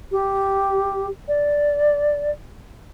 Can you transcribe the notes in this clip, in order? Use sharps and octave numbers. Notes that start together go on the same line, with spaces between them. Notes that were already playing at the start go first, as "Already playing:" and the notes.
G4
D5